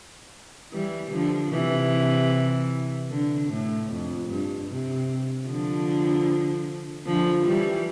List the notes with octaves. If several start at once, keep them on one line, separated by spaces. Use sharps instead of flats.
E3 G3
D3 F3
C3 E3
D3
A2
F2
G2
C3
D3 F3
D3 F3
E3 G3